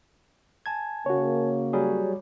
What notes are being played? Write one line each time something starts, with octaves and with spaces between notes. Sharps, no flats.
G#5 A5 G#6
C#3 A#3 F#4 C#5
F#3 G3 G#4